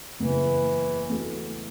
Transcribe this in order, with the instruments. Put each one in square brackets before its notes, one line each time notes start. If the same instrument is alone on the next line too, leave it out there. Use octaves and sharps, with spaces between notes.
[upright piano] F#1 E2 C#3 [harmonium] E3
[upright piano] E2 E3 A3 F#4